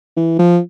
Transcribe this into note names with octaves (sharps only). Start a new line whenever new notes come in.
E3
F3